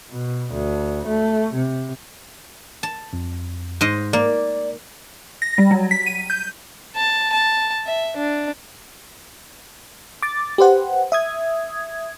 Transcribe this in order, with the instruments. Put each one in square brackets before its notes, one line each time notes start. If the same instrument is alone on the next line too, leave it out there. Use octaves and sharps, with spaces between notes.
[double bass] B2
D2
A3
C3
[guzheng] A5
[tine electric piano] F2
[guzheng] G#2 C5 D#5
[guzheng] A#3 [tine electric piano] D5
[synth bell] A#6
G3
F#3
B6
D#7
G6
[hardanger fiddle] A5
A5
E5
D4
[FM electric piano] D6 A6
G4 B4 C5 F#5
E5 D#6 G#6